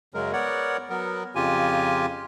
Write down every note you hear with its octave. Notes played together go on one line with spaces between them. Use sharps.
F#2 C#3 F#3 G#3 A#4
B3 A#4 C#5 D5 F#5
F#3 B3 A#4
F2 C#3 F4 G4 G#5